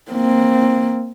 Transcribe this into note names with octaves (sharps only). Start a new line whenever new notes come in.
A#3 C4